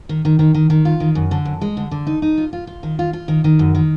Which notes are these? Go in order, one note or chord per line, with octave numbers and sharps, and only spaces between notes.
D#3
D#3
D#3
D#3
D#3
F4
D#3
F#2
D3
F#2
G#3
D3
D3
D#4
D#4
F4
F4
F4
D#3
F4
F4
D#3
D#3
F#2
D#3